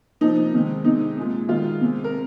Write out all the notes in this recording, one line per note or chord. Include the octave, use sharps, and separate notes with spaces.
C3 F3 A#3 D#4
C3 D#3 G#3
C3 G#3 D#4
A#2 G#3
D#3 G#3 F4
C3 G#3
A#4